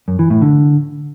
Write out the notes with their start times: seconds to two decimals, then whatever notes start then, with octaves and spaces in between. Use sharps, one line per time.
0.08 F#2
0.19 E3
0.30 A2
0.42 D3